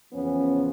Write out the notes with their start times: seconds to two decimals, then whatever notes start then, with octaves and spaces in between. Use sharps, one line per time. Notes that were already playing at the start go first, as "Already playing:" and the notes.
0.12 E2 C#3 F3 B3 C#4